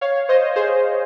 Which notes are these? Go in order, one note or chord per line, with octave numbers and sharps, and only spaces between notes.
C#5 F5
C5 D#5
G#4 C5